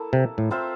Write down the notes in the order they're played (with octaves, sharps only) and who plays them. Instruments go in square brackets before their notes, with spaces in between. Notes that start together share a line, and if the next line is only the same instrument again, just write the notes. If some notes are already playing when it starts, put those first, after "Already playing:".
Already playing: [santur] A#3 E4 A4
[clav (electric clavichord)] C3
A2
[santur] C4 F4 C5 E5